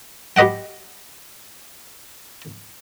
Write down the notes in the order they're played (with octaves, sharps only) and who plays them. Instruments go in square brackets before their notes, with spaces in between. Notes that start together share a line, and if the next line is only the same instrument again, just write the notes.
[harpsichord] G4 B4 D#5 F#5 G5